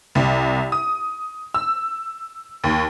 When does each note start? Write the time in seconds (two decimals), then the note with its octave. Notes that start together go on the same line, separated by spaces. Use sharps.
0.15 C2
0.72 D#6
1.54 E6
2.64 D#2